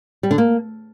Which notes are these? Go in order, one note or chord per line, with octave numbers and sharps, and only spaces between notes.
G3
D3
A#3